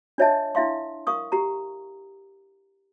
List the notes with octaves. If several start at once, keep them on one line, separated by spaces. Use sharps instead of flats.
D4 F4 C#5 D#5 E5 A5
D4 E4 E5 F5 C6
A#4 F5 C#6 D#6
G4 A#5